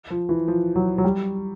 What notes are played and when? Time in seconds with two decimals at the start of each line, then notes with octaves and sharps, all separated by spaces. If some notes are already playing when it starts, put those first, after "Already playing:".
0.10 F3
0.29 E3
0.48 F3
0.76 F#3
0.98 F#3
1.04 G3